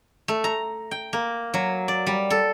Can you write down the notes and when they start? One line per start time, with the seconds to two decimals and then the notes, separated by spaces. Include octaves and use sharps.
0.28 A3
0.44 A#5
0.91 G5
1.13 A#3
1.54 F#3
1.88 D5
2.07 G3
2.30 A4